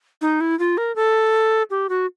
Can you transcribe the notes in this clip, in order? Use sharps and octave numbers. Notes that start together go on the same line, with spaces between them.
D#4
E4
F4
A#4
A4
G4
F#4